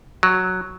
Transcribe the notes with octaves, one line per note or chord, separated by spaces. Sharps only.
F#3